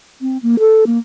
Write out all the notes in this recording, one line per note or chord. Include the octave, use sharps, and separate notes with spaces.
C4
A#3
A4
A#3